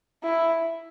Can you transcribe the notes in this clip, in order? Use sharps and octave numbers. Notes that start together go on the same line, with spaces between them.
E4